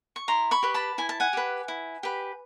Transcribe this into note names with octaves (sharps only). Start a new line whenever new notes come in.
C#6
E4 A#5 C6
B5 C#6
G4 B4
A5 B5
E4 G#5
A5
F#5 G#5
G4 B4
E4
G4 B4